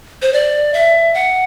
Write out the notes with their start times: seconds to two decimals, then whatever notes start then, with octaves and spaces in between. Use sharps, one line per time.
0.22 C5
0.33 D5
0.74 E5
1.14 F#5